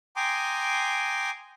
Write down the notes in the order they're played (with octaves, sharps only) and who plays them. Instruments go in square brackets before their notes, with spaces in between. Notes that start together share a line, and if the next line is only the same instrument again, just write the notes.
[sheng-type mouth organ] G5 G#5 A#5 C6 D6 D#6